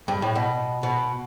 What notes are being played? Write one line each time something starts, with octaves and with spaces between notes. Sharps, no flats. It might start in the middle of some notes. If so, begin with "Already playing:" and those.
G2
A2
B2
B2